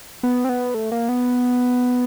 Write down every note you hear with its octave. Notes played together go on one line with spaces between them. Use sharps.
B3
C4
B3
A3
A#3
B3